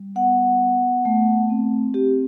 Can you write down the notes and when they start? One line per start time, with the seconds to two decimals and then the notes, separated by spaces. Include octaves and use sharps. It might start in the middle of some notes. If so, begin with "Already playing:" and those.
Already playing: G3
0.15 B3 F#5
0.61 B3
1.05 A3
1.50 C4
1.94 C4 G4